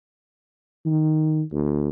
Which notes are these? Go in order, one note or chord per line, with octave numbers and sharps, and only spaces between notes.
D#3
D2